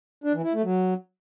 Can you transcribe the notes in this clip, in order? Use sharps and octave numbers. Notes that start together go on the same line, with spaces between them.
D4
E3
E4
A3
F#3